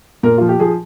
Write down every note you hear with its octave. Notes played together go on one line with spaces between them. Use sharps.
A#2 A#4
F3 F4
G4
F3 G#4